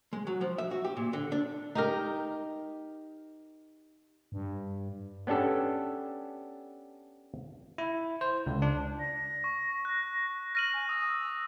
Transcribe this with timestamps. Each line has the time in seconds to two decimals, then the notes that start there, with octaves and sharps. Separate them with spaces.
0.13 G#3
0.27 F#3
0.41 F3
0.58 E5
0.71 F#4
0.85 G4
0.97 A#2
1.13 D3
1.32 D4
1.75 D#4 G4 A#4
4.32 G2
5.27 B3 C#4 D4 G4 A4
7.78 E4
8.21 C5
8.46 C#2
8.62 D4
9.00 A#6
9.44 C#6
9.85 F#6
10.55 F6 A#6 D#7 F#7
10.73 G#5
10.89 D#6 E6